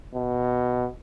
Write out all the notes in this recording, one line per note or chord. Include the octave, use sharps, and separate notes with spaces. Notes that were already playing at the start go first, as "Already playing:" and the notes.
B2